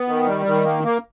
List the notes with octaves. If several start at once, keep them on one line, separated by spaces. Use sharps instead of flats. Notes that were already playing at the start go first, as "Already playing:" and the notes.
Already playing: B3
D#3
G3
D#3
A#3
A#3